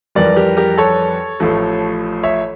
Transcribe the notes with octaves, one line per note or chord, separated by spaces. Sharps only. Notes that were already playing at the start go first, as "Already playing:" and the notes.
F2 E3 G3 A#4 D5
G4 A#4
G4 A#4
A4 C#5
A1 A2 F3 A3
C#5 E5